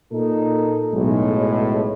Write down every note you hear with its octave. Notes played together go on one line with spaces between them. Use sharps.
A#2 D#4 A4
B1 A2 G#3